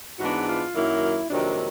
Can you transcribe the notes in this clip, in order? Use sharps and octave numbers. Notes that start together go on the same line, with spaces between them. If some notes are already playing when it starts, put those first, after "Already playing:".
G#2 E3 G#3 B3 D4 F#4
F4
F#2 D#3 F#3 A#3 E4
F2 C3 D#3 F#3 A#3 D4